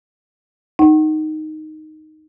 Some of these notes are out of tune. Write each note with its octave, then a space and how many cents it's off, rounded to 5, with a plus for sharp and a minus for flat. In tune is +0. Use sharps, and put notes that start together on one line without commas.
D#4 +0 F#5 +35